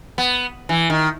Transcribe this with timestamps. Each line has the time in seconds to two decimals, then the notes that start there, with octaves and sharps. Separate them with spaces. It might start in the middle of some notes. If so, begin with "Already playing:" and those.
0.18 B3
0.69 E3
0.90 D#3